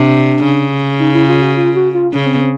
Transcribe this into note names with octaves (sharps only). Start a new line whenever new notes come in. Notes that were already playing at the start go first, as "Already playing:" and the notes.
Already playing: C3 D4
C#3
D#4
E4
F4
F#4
F4
F#4
F4
C#3 C#4
C4
B3
C4